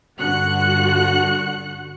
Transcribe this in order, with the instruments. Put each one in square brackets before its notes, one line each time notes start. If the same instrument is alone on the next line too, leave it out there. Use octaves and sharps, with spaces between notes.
[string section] G2 D3 F#4 F#5 F#6 C#7